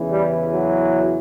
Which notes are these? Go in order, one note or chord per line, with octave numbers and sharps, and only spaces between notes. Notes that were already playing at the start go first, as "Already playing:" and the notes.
Already playing: E2 C#3 E3
G3
F#3